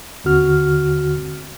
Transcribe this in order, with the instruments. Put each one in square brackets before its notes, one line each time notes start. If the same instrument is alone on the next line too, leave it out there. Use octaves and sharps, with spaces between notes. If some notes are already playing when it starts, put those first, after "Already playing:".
[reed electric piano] D#2 D3 C4 F#4 F6